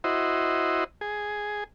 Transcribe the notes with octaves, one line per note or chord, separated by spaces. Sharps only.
E4 F#4 C5 D#5
G#4